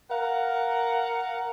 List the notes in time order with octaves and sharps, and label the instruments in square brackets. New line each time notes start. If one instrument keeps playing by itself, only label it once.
[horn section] A#4 F5 F#5